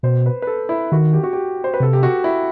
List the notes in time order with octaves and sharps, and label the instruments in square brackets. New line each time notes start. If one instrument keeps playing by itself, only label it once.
[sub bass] B2 [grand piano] C5
[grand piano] B4
B4
A4
E4
[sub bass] D#3 [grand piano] F#4
[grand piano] G4
F#4
G4
C5
B4
[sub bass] C3 [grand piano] A4
[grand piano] G4
F#4
E4